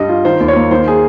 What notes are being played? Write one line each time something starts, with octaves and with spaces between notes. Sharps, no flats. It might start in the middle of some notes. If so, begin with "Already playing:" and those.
Already playing: G2 G3 D#5
F4
D#3 C5
D#2
C#5
A#3
D#3 C5
G#4